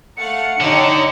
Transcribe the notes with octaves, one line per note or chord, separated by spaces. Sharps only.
A3 F5 F#5 C#7
D3 D4 D#4 G4 C#5